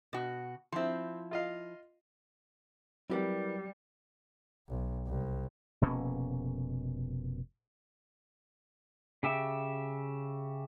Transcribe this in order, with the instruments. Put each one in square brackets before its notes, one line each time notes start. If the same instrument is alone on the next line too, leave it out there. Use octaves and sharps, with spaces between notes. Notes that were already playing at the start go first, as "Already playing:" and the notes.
[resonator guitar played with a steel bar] B2 F#4
[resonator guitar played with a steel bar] F3 E4 [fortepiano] C4 C6
[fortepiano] F4 D#5 F5
[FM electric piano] F#3 [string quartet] G3 [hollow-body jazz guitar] C4 G4 F#5 [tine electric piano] E4 A#4 B4
[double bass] B1
C2
[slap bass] F1 B2 A#3 C#4
[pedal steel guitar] C#3 G4 E5